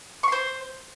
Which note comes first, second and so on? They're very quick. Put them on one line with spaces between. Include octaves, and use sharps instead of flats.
C#6 C6 C5